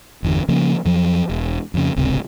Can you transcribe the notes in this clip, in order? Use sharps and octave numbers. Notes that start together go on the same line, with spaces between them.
G1 E2 D3
C#3 F3 A#3 C#4
F2 F3 F#3
E1
F2 C#3
D1 G#1 C#2 C3